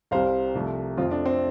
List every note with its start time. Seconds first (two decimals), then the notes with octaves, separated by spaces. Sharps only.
0.11 C2 C3 G3 C5 F5
0.55 C2 C3 F3 A3
0.97 F2 F3 A3 C4 F4
1.11 D4
1.26 C4